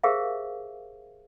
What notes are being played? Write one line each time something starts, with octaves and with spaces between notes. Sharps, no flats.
G4 G#4 A#4 C5 E5 F5